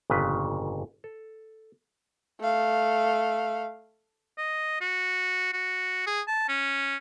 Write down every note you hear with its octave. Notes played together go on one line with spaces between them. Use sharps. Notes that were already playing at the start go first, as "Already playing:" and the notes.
G1 F2 A#2 C#3 B4
A4
A3 F5
D#5
F#4
F#4
G#4
A5
C#4